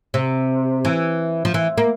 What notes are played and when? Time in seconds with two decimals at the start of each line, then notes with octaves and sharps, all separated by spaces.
0.14 C3
0.85 E3
1.45 F3
1.54 E3
1.78 A#3